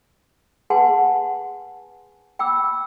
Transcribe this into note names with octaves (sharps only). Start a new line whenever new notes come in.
G#4 B4 F#5 G#5 A5 C6
G5 B5 D6 E6